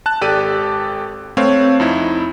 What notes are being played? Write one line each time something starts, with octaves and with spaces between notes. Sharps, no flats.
A5 F#6
G#1 G4 A4 D5 D#7
A3 C4 B4 C#5 F5
F2 D#4 E4